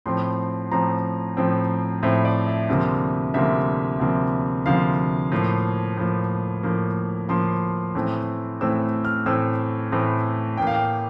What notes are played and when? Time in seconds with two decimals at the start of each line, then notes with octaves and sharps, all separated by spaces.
0.06 A2 F3 C4 C6
0.71 A2 F3 C4 A#5
1.37 A2 F3 C4
2.03 A2 F3 C4 E5
2.25 D5
2.47 E5
2.69 D2 C3 F3 A#3
3.34 D2 C3 F3 A#3 E5
4.00 D2 C3 F3 A#3
4.66 D2 C3 F3 A#3 F5
5.32 A2 F3 A#3
5.97 A2 F3 A#3
6.63 A2 F3 A#3
7.29 A2 F3 A#3 C6
7.95 A2 E3 A3 C4
8.61 A2 E3 A3 C4 E6
9.05 F6
9.26 A2 E3 A3 C4 E6
9.92 A2 E3 A3 C4
10.57 A2 E3 A#3 G5
10.67 F5
10.75 G5